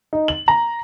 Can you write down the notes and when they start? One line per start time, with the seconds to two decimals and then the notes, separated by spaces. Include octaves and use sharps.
0.13 D#4
0.28 F#7
0.48 A#5